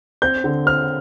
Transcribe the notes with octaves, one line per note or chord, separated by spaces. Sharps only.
C4 G6
D3
C4 F6